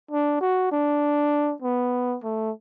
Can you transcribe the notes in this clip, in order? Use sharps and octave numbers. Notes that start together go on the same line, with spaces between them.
D4
F#4
D4
B3
A3